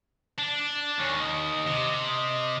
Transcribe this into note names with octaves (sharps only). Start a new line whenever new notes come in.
D4
D#2 C#4
D#5
C3
D#5